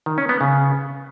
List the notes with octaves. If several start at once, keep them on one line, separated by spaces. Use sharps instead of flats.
D#3
C#4
B3
C#3